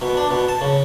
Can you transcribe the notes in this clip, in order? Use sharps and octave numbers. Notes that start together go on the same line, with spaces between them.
B2
D4
B2
A5
C#3